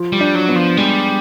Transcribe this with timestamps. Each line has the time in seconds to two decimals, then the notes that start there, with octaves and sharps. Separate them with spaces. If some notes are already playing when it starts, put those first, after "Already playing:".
Already playing: F3
0.12 G3
0.20 D4
0.35 F#3
0.49 B3
0.55 F3
0.77 G3 G#3